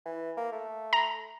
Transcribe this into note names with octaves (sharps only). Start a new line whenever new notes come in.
E3
A#3
A3
A#5